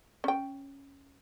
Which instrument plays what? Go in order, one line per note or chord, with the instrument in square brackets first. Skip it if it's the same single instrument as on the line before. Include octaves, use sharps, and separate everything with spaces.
[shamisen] C#4 G5